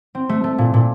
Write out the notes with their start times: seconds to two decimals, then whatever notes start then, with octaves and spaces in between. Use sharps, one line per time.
0.15 C4
0.29 A3
0.44 A3
0.58 A#2
0.74 A#2